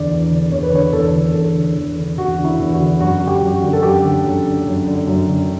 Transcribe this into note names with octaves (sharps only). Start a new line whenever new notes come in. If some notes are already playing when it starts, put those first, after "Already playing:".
Already playing: E2 D3 D5
E2
D3
E2 C#5
B4
D3 C#5
E2 A4
D3
E2 A4
D3
E2
D3
E2 F#4
D3
E4
E2
F#4
D3
F#2 F#4
D3
G4
F#2
F#4
D3
A4
F#2 G4
D3
F#2
D3
F#2
D3
F#2
D3